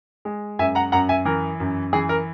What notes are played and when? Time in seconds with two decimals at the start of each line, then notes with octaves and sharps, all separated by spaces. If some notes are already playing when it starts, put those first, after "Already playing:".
0.25 G#3
0.59 F#2 E5 G#5
0.75 F#5 A#5
0.92 F#2 F#5 A#5
1.09 E5 G#5
1.25 E3 A#4
1.60 F#2
1.93 E3 G#4
2.09 A#4